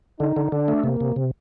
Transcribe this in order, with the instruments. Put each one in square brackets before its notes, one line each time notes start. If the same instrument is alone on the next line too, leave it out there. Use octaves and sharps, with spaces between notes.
[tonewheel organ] D3 [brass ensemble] D#4
[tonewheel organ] D3
[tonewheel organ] D3 [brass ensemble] D4
[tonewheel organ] A3
[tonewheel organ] C3 [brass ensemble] A#3
[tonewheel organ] C3
C3